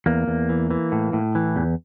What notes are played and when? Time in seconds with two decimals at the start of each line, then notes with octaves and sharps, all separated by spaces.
0.06 E2 A#3
0.28 E2
0.49 E3
0.70 E3
0.92 A2
1.13 A2
1.35 E3
1.56 E2